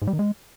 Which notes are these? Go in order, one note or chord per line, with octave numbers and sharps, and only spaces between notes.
G#2
G3
D#3
G#3